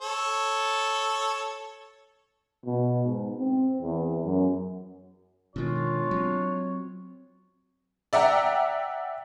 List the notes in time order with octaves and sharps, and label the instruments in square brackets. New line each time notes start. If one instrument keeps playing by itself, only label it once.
[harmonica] A4 C#5
[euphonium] B2
G#2
C4
E2
F#2
[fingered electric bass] B2 D#3 [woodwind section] G#3 D4 F4 [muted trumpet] C#5
[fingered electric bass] F#3 C4
[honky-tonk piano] D5 E5 F#5 G5 A#5